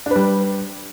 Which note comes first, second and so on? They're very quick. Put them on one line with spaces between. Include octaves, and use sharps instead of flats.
D4 B4 G3